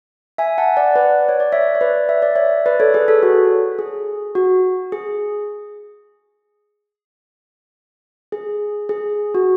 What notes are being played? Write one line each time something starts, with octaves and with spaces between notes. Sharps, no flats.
E5 G#5
F#5 A5
D5 F#5
B4 D5
C#5
D5
C#5 E5
C#5
B4 D5
E5
D5
C#5 E5
B4 D5
A4 C#5
G#4 B4
A4 C#5
F#4 A4
G#4
F#4
G#4
G#4
G#4
F#4